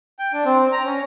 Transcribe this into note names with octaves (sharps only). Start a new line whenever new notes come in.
G5
D4
C4
A#5
C#4